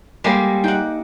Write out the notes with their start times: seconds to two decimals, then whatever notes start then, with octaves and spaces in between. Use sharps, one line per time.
0.24 G3 G#3 A#3
0.64 D#4 F#5 G5